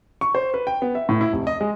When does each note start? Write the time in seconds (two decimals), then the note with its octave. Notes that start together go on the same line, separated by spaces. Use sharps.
0.21 C#6
0.35 C5
0.54 B4
0.67 G5
0.82 B3
0.95 E5
1.09 A2
1.21 E4
1.33 F1
1.47 D#5
1.61 G#3